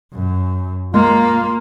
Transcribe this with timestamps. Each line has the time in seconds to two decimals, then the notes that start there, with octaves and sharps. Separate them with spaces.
0.14 F#2
0.94 G#3 A#3 F4